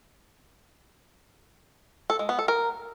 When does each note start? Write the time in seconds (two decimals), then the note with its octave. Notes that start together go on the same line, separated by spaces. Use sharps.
2.10 A4
2.19 G#3
2.29 B3
2.39 A4
2.48 A#4